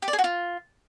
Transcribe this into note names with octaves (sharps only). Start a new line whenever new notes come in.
G4
D5
G#4
F#4
F4